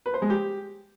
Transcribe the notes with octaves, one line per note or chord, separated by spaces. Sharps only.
B4
C5
G#3
G4